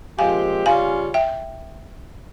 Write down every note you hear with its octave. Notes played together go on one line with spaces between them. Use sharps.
A#2 F3 G#3 C4 G4 F5 G#5
C#3 G3 C#4 F4 F5 G#5
E5 G5